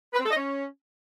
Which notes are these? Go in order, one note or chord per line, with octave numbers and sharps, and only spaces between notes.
B4
C4
A4
D#5
C#4